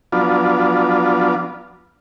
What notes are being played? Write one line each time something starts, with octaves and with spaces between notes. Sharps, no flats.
F3 F#3 B3 D4 F4